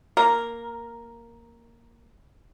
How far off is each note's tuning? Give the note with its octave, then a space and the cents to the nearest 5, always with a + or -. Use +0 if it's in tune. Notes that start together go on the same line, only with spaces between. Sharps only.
A#3 +0 A#4 +0